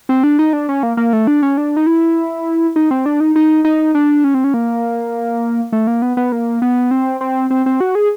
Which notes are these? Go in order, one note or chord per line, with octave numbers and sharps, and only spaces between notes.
C4
D4
D#4
D4
C#4
A#3
A#3
A3
D4
C#4
D4
D#4
E4
D#4
C4
D4
D#4
D#4
D#4
D4
C#4
C4
C#4
A#3
A3
A#3
B3
B3
A#3
B3
C4
C4
C4
C4
F#4
G#4